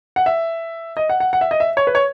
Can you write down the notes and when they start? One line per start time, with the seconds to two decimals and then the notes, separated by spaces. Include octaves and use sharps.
0.16 F#5
0.26 E5
0.97 D#5
1.10 F#5
1.20 F#5
1.33 F#5
1.41 E5
1.51 D#5
1.60 E5
1.77 C#5
1.87 B4
1.95 C#5